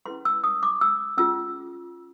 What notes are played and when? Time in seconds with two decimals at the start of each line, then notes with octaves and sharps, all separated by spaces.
0.06 C#4 E4 G#4 B4 C6
0.25 E6
0.44 D#6
0.63 D6
0.81 E6
1.17 C#4 F4 G#4 E6